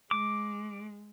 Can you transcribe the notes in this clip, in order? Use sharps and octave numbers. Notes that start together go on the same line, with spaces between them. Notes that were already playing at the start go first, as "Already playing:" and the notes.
G#3 D6